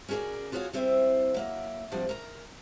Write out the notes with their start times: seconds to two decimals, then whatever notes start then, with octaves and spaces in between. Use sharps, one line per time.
0.09 C#4 F#4 G#4 A#4 D5
0.52 F4 F#4 G#4 C#5 F5
0.73 G3 C4 E4 C5 E5
1.34 F#3 A#3 E5
1.92 F3 G3 C4 D4 F#4
2.09 A#4 A#5